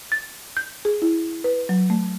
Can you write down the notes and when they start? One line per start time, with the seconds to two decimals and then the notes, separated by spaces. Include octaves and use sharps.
0.12 A6
0.57 G6
0.85 G#4
1.02 E4
1.44 B4
1.69 F#3
1.90 A3